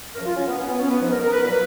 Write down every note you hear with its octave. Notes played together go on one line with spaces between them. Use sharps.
F#2 C#3 F3 A#4
F4
C#4
B3
G#2 F3 C#4
B3
C#4
B3
G#2 F3
A#4
A#4
B4
A#2 F#3 B4